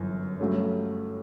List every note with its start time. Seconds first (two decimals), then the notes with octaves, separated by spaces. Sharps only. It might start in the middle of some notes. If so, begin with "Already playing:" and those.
Already playing: G1 F#2 E3
0.40 G2 F#3 A3 C#4